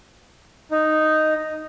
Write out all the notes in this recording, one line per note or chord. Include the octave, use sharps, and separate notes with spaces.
D#4